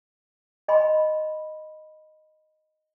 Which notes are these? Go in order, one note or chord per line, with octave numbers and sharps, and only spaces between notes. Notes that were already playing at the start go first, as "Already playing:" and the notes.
D#5 G#5 B5 C6